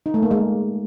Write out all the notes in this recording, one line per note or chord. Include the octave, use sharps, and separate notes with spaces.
D#4
A3
A#3
G#3